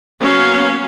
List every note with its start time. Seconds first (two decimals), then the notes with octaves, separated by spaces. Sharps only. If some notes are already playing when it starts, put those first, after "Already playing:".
0.21 F#3 A#3 B3 C#4 F5